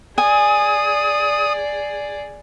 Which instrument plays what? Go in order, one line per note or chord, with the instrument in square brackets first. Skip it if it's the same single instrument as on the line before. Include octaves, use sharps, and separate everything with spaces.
[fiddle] G#4 D5 [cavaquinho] G#5 [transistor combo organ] D#6